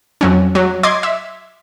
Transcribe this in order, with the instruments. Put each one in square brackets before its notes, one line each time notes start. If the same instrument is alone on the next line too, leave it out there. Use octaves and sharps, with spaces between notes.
[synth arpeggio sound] F2 F#3 C#4
F#3
D#5 C6 D6 G#6
E5